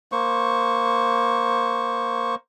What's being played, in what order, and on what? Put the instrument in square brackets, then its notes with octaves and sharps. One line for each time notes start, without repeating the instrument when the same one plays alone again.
[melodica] A#3 C5 C#6